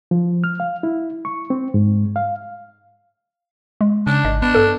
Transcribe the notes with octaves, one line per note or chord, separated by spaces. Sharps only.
F3
F6
F5
E4
C#6
C4
G#2
F5
G#3
C#3 D4
G#1 D#5
B3 D4
G2 A4